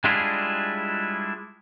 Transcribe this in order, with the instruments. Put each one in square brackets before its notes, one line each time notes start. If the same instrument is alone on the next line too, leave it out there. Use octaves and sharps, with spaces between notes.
[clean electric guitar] G3 G#3 D4 E4 F4 G#4